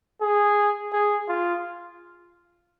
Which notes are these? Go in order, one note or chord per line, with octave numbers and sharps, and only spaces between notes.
G#4
G#4
F4